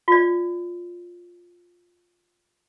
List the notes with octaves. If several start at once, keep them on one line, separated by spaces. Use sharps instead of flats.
F4 D5